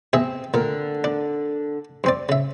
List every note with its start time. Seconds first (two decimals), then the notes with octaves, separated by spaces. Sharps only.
0.13 B2 C4 G#4 E5
0.54 A#2 D3 A#4
1.04 D4
2.04 G2 C4 D5
2.29 C#3 E5